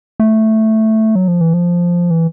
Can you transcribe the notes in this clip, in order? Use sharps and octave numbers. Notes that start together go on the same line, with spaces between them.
A3
F#3
F3
E3
F3
E3